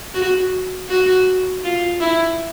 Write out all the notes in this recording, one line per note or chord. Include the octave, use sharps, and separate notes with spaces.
F#4
F#4
F4
E4